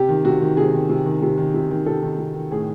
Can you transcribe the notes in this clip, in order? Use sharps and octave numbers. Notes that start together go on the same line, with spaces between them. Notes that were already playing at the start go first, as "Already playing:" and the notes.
Already playing: C3 G4
D#3
C3 F#4
D#3
C3 G#4
D#3
C3
D#3
C3
D#3
C3
D#3
C3 A4
D#3
C3
D#3
A2 G#4